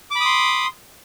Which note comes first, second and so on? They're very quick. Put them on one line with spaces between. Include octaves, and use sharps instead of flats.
D6 B5 D#6 C6